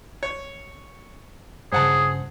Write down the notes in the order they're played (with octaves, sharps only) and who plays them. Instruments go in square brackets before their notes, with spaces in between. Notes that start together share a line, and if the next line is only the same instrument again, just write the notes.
[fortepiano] C#5
[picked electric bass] G2 C#3 [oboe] G#4 [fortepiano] C5 F#5 A5